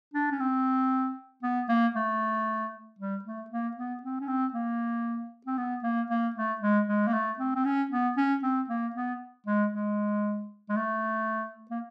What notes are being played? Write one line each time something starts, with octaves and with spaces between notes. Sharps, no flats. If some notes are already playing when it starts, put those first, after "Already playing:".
D4
C#4
C4
B3
A#3
A3
G3
A3
A#3
B3
C4
C#4
C4
A#3
C4
B3
A#3
A#3
A3
G#3
G#3
A#3
A3
C4
C4
C#4
B3
C#4
C4
A#3
B3
G#3
G#3
G#3
A3
A#3